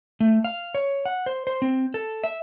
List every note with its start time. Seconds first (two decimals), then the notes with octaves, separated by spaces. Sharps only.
0.20 A3
0.44 F5
0.75 C#5
1.05 F#5
1.26 C5
1.47 C5
1.62 C4
1.94 A4
2.24 E5